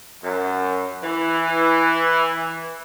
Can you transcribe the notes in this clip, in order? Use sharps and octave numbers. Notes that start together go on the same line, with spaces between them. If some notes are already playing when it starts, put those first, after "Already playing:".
F#2
E3